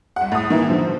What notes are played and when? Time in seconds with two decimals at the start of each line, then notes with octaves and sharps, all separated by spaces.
0.16 C2 F#5
0.32 A2 D#6
0.50 D#3 E3 A#3
0.68 D3 F3